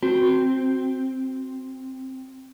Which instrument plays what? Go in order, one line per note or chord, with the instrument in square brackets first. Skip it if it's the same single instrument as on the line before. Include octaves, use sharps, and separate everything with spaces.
[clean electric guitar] C4 [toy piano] F#4